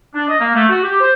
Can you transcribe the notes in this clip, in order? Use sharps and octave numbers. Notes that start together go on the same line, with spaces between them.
D4
D#5
A#3
A3
F#4
G4
C5